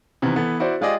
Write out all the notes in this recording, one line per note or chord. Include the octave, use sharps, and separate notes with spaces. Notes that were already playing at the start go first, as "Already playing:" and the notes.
C3 D#3 E3 B3
E3 B3 A4
E4 F#4 C5 D5
G#3 F4 G4 G#4 D5 D#5